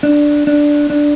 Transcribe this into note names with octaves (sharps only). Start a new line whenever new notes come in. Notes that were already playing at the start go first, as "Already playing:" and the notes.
D4
D4
D4